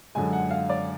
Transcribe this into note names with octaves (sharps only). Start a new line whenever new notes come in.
F#2 D3 G#3 G#5
F#5
F5
D5